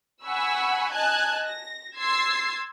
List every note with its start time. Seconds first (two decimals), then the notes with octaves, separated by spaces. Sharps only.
0.24 F#5 G#5 B5 C#6 E6
0.91 D#5 G#5 A5 F#6 G#6
1.47 A#6
1.96 C6 E6 G#6 A6 C7